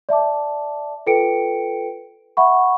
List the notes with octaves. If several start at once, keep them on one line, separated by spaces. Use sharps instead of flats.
D5 E5 A5 D6
F4 A4 B4 G5 C#7 D7
E5 F#5 B5 C#6